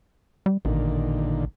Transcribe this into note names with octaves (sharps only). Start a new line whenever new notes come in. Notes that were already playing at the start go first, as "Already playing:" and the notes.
G3
A1 A#2 D3 D#3